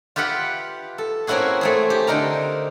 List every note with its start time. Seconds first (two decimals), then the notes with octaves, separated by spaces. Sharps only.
0.16 F4 G4 B4 E5 F#5
0.98 A4
1.27 A#3 C4 C#4 E4 F#4 G#4
1.61 A3 C4 G#4
1.90 G4
2.07 D3 C4 D#4 A#4 A#5